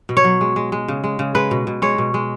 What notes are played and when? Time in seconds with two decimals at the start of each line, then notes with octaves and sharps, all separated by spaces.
0.09 B2
0.17 C#5
0.24 F#3
0.41 G#3
0.56 G#3
0.72 G#3
0.88 C#3
1.04 G#3
1.19 C#3
1.35 G#3 B4
1.51 B2
1.67 B2
1.82 G#3 C#5
1.98 B2
2.14 G#3